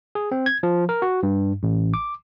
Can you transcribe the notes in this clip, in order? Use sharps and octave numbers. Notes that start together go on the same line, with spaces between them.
G#4
C4
G#6
F3
A#4
F#4
G2
A1
D6